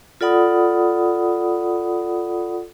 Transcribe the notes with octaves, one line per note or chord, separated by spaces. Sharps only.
F4 A4 D5 F#5 B5 D#6